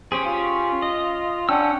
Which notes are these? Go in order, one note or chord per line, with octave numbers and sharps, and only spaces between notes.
C#4 G4 G#4 C5
F4
D#5
C#4 D4 F#5 G5 E6